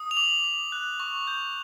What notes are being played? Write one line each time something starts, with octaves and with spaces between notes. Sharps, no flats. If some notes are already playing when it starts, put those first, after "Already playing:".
Already playing: D#6
F7
D6 F#7
D6
F#6
C#6
G6